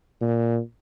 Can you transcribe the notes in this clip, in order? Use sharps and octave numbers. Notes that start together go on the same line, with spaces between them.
A#2